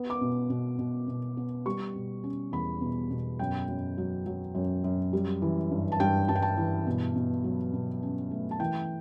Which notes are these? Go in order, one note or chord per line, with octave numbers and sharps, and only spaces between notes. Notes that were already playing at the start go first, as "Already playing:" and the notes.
Already playing: B3
D6
B2
B2
B2
B2
B3
G3 C#6
B2
C#4
E2 B5
B2
B2
F#2 G5
F#2
F#3
F#3
F#2
F#2
G3
E3
G2
A5
G2 G5
G2 A5
G5
A5
E3
B2
B2
F#3
B2
C#4
A3
A5
E3 G5